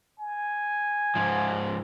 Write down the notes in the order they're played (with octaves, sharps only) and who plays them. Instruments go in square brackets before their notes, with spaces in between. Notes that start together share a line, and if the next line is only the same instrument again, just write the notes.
[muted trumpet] G#5
[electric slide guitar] G#2 F3